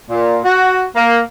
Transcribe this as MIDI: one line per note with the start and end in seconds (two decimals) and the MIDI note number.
0.10 0.39 46
0.45 0.84 66
0.96 1.19 58